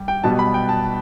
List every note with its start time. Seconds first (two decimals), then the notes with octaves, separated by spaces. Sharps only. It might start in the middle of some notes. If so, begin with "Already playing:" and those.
Already playing: G3
0.08 G5
0.23 B1 B2 G3 B3 A5
0.39 B5
0.54 G5
0.69 A5